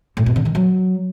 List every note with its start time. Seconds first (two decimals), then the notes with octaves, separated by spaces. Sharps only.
0.17 A2
0.26 B2
0.36 D3
0.45 D#3
0.55 F#3